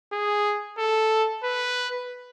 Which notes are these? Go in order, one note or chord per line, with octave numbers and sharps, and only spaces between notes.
G#4
A4
B4